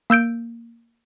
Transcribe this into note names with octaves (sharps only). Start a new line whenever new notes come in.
A#3 E6 G6 D7